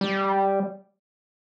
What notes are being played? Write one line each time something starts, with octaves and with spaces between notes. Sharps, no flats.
G3